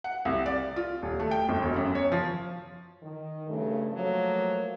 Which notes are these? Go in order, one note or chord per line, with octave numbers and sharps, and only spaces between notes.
F#5
C2
D5
F4
D#1
A3
G5
G1
E1
F#2
C#5
F3
D#3
G2 C#3 A3
F3 F#3 A3 A#3